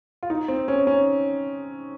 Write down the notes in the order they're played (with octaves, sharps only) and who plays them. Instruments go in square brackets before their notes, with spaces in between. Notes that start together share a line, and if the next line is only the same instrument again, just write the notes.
[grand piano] F4
D#4
C4
C#4
C#4